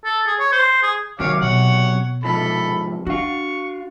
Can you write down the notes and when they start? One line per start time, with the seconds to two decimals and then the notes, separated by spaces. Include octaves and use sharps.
0.05 A4
0.27 G#4
0.39 C#5
0.52 C5
0.83 G#4
1.20 C3 D#3 F#3 C#5 F5 D6
1.41 B2 B3 C#5 F#5
2.24 G#2 C3 F3 A4 B5
3.07 D4 F#4 F5 C#6